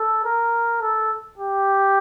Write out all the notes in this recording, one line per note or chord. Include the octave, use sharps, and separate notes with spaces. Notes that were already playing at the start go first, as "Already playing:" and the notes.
Already playing: A4
A#4
A4
G4